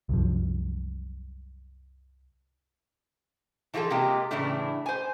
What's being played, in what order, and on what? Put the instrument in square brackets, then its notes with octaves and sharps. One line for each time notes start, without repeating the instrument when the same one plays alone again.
[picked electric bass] C2 F#2 F3
[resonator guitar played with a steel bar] E3 F3 F4 G#4 A4
C3 G#3 A#3 F4 G4
A2 C#3 E3 A3 D4 E4
C5 G#5